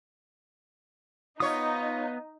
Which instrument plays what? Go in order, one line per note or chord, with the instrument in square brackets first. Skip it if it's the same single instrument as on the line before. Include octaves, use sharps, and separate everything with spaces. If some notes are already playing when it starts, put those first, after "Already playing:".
[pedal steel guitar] B3 D#6 [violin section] D#4 [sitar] F4 C#5